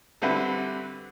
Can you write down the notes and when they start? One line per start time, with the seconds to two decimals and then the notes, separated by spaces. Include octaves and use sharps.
0.22 D3 G3 C4 E4 F#4 B4